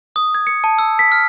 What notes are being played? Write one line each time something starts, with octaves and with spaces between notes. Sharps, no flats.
D#6
G#6
C#7
A5
E6
B6
F6